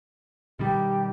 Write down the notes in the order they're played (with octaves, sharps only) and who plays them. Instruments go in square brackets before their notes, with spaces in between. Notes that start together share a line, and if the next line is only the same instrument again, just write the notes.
[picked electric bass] B2 D#3 G3 [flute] G4